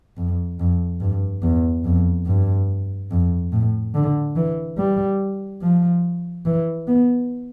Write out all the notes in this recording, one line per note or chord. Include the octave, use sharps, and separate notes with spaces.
F2
F2
G2
E2
F2
G2
F2
A2
D3
E3
G3
F3
E3
B3